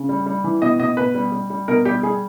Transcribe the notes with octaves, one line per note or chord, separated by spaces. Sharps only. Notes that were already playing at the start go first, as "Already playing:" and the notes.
Already playing: C#3
G3
G3
E3
B2 D#5
B2 D#5
B2 B4
G3
G3
G3
B2 A#4
G3 G4
G3 G#4